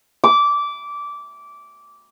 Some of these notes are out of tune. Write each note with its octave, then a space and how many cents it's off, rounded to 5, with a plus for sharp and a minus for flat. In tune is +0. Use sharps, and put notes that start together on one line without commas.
D6 -15